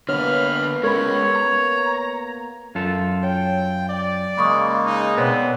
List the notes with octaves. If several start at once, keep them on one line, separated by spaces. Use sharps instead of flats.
D3 A#3 B3 B4 C#5 F6
G#3 C#4 A#4 C#5 B5
A#5
F#2 F4 A4
C#5 G5
D5
C#3 G#3 A#3 B5 C#6 D#6
D#4
B2 B3 C4 C#5 D5